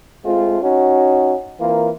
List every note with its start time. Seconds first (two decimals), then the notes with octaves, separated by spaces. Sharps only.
0.25 G#3 A3 C4 F4
0.62 C#4 D#4 F#4
1.60 E3 A#3 C4 F4 A#4